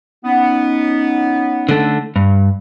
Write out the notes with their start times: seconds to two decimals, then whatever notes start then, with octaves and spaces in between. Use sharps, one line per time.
0.25 B3 C#4 D#4
1.69 D3 A3
2.16 G2